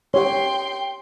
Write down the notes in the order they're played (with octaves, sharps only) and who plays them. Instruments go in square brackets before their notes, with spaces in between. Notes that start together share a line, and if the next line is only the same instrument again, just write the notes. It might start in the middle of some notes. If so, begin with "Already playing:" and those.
[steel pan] G4 C#5 [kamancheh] G5 C6